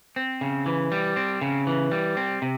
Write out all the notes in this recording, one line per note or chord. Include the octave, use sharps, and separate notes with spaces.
C4
C#3
E3
G3
C4
C#3
E3
G3
C4
C3